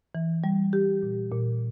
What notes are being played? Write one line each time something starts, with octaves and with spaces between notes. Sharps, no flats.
E3
G3
G4
A#2
A#2